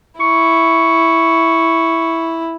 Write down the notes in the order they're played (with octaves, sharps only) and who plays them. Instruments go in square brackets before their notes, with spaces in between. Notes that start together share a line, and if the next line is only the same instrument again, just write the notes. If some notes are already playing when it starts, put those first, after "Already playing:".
[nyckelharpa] E4 [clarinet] C#6